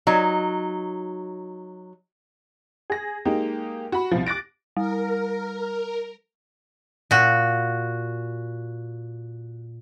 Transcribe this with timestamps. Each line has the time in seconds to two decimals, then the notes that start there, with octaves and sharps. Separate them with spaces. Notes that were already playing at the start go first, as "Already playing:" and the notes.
0.07 F#3 D#4
2.90 G#4 A#6
3.25 G#3 A#3 D#4 G4
3.92 F#4 B5
4.11 C2 F3
4.27 D6 F#6 A6 A#6 D7
4.77 G3 A#4
7.11 A#2 F#4